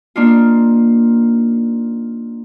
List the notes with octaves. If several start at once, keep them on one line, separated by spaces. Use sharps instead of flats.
A#3 D4 D#4 F4